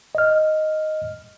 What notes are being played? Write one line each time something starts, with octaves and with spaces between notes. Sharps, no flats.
D#5 F6